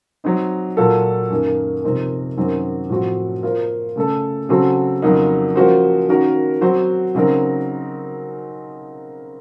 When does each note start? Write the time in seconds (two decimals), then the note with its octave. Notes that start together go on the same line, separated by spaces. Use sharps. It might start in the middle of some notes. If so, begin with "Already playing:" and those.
0.24 F#3 C4 D#4
0.77 A#2 F#3 A#3 F4 A4
1.30 F#2 D#3 A#3
1.84 C3 F3 C4 D#4 A#4
2.37 F#2 D#3 F#3 C4
2.90 A2 F3 C4 F#4
3.43 A#3 F4 C5
3.96 C#3 A3 C#4 A4
4.49 C#3 F#3 C4 F#4 A4
5.02 F2 C#3 F#3 A#3 D#4
5.56 F3 A#3 C#4 F#4 C5
6.08 D#3 A#3 C#4 F#4 A#4
6.61 F#3 C4 F#4 C5
7.15 C#3 F#3 C4 D#4 A#4